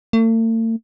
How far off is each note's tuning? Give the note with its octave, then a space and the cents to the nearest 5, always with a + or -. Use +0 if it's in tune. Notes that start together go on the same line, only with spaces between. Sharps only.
A3 +45